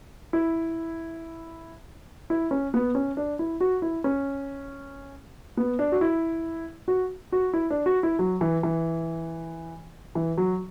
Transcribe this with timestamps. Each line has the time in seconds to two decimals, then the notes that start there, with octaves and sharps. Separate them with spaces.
0.33 E4
2.30 E4
2.51 C#4
2.74 B3
2.95 C#4
3.17 D4
3.39 E4
3.60 F#4
3.82 E4
4.04 C#4
5.57 B3
5.79 D4
5.92 F#4
6.01 E4
6.88 F#4
7.32 F#4
7.53 E4
7.70 D4
7.86 F#4
8.03 E4
8.19 F#3
8.41 E3
8.63 E3
10.15 E3
10.37 F#3